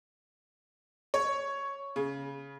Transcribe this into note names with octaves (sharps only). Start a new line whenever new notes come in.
C#5
C#3